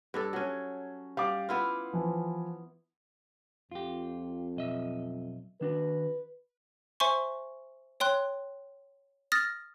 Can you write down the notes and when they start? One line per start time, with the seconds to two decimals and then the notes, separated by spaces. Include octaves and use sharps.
0.14 G2 D4 A4
0.33 F#3 C#4
1.17 G3 F5 D6
1.49 B3 E4 F4
1.93 E3 F3
3.71 F2 F4 G4
4.57 B1 D#5 E5
5.61 D#3 D4 F#4 B4
7.00 C5 E5 G#5 C6 C#6
8.00 C#5 G5 C6 F#6
9.32 D#6 F6 A6 A#6